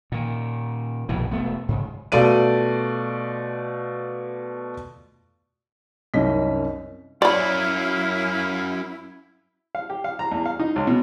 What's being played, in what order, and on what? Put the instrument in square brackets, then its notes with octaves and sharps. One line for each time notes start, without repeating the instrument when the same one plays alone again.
[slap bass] A#2 D#3
A#1 F2 B2 E3
E1 A3 B3
G#2 C#3
[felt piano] B2 A3 F4 D5 D#7
C2 F#2 C#4 D#4 B6
[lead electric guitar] F#2 C#4 [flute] E4 [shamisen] D5 B5 [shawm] F5
[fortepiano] F5
G4
F5
A#5
E2
F5
D#4
C#2
B2